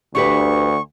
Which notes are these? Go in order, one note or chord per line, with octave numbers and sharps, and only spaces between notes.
D2 D4 G4 B4 C#6